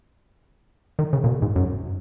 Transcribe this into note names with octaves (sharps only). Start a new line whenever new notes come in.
D#3
C#3
A#2
B2
G#2
F#2